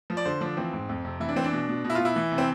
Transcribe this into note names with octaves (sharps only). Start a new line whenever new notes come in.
F3
D5
D3 C5
F3 D4
E3 C4
G#2
F2
C3
E3 E4
D4
E3 C4
D4
B2
B2
B2
E4
B2 F4
E4
E3
C3
C4